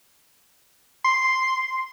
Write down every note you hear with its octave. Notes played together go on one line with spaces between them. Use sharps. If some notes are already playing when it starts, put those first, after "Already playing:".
C6